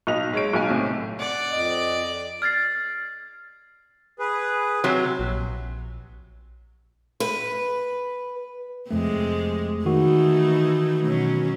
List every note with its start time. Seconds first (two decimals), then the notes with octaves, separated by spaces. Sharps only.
0.07 B1 D#5 F7
0.33 G#3 C#5 D7
0.53 B1 G#5
0.70 A2 C3
1.20 D5 F#5
1.52 F2 D#5
2.42 F6 G#6 A6 C7
4.19 G#4 B4
4.84 C3 F#3
5.19 A#1
7.20 B4
8.91 F2 C3 G#3 A3
9.85 D#3 E3 A3 D#4 F#4
11.04 B2 F#3 C#4